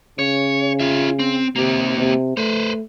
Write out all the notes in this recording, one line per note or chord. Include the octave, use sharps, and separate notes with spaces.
C#3 C#5
F4 E5
C4
C3 A#3 G4
C3
A3 B4 C5